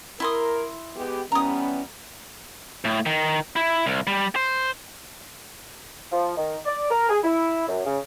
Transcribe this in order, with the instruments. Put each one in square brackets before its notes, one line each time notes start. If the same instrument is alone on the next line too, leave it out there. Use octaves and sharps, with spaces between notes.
[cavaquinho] E4 C6 D#6 [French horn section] A#4
[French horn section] G#3 B3 G4
[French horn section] E3 G3 B3 [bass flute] C#4 [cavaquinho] A#5 D#6
[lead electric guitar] A2
D#3
E4
C2
G3
C5
[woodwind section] F3
D#3
D5
A#4
G#4
E4
F#2
C#3